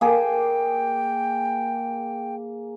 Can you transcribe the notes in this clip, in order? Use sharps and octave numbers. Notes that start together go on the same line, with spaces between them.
A#3 G#4 G5